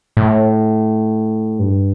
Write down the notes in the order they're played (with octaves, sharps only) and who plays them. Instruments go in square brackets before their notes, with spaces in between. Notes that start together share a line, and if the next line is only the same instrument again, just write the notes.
[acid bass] A2
G2